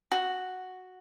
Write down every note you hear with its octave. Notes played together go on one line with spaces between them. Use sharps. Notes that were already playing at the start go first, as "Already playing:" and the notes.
F#4